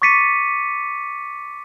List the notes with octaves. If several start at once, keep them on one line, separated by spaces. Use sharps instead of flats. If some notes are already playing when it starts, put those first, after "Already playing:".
C#6 D6 A6 B6 C#7 D#7